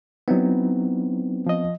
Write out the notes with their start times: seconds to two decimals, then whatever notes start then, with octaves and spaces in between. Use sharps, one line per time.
0.28 F#3 B3 C4 D#4 E4
1.46 F3 D#5